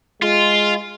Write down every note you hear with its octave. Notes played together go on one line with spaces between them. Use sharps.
G#3 F4